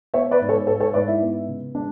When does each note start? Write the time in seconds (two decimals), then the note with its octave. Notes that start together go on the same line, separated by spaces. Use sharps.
0.14 B3 C#5 E5
0.31 B4 D5
0.41 G#2
0.49 A4 C#5
0.67 G#2 A4 C#5
0.80 A4 C#5
0.94 G#2 B4 D5
1.08 E4
1.21 B3
1.48 C#3
1.75 G#3 D4